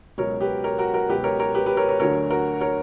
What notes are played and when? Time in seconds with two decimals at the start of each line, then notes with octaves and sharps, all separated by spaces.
0.18 C#2 B2 F#3 A#4 C#5
0.41 G4 B4
0.64 A#4 C#5
0.78 F#4 A#4
0.94 F#4 A#4
1.09 C#2 B2 F#3 G4 B4
1.24 A#4 C#5
1.40 A#4 C#5
1.55 G4 B4
1.66 G4 B4
1.77 A#4 C#5
1.89 A#4 C#5
2.00 D2 D3 F#3 A#4 C#5
2.31 F#4 A#4
2.61 A#4 C#5